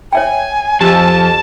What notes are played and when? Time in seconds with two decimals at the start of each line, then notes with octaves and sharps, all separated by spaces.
0.13 C#5 E5 G5 G#5
0.81 F2 G4 A5 E6